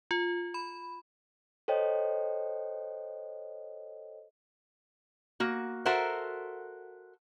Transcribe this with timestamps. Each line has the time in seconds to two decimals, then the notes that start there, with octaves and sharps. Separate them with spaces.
0.11 F4
0.54 B5
1.68 A4 C5 C#5 D#5 G5
5.40 A#3 F#4
5.86 F#4 A4 A#4 C5 E5 F#5